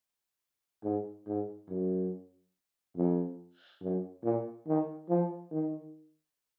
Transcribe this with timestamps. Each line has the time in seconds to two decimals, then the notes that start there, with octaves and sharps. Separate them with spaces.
0.83 G#2
1.27 G#2
1.69 F#2
2.96 F2
3.82 F#2
4.24 A#2
4.67 D#3
5.09 F3
5.51 D#3